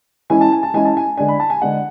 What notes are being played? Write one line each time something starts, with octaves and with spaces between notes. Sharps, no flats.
E3 G#3 C#4 E4 G#5
A5
G#5
A5
E3 G#3 C#4 E4 G#5
A5
G#5
D3 G#3 D4 G#5
B5
A5
G#5
D3 G#3 D4 F#5